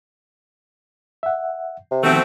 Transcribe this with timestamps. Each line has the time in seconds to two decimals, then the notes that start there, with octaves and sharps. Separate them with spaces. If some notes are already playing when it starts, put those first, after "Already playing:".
1.23 E5 F#5
1.91 C3
2.04 B2 D#3 F3 A3 C4